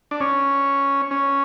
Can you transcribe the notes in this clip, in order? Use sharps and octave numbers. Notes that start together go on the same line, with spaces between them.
D4
C#4
C#4